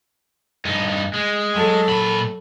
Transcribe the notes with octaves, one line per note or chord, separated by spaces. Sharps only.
G2 D#4
G#3
F#3 A4
A#2 B5